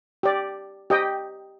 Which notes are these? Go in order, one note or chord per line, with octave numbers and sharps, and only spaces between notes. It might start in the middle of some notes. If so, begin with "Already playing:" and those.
G4 D5
G4 D#5 G5